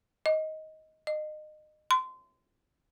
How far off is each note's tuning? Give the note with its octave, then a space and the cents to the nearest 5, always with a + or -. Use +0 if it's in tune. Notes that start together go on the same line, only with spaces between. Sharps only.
D#5 +15
D#5 -25
C6 -25